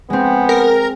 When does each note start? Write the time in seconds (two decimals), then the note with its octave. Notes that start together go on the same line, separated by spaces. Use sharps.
0.10 G#3 B3 C4
0.49 A#4